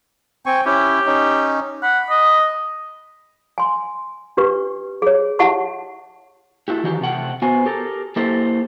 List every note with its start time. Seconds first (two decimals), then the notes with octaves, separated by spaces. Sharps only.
0.46 C4 G5 G#5 C#6
0.66 C#4 E4 G4
1.06 C#4 D#4
1.83 F#5 B5
2.10 D#5
3.58 G#5 C6
4.37 D4 G4 B4 C#6
5.02 G#4 C#5
5.39 E4 G4 E5 F#5 A5 C#6
6.68 A3 E4 F#4 G4
6.84 D#3 E3 F#4 G4
7.01 C3 A3 F#5 G5
7.42 B3 F#4 C5 G#5
7.66 G4 A4 A#4
8.16 A#3 E4 G4 A4 C5